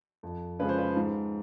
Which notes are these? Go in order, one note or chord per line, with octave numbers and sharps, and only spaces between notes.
F2
C#3 F3 G#3 B4
C5
B4
G#2